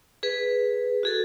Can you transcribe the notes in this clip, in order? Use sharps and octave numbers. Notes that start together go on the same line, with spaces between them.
G#4 B4
F#4 G#4 A4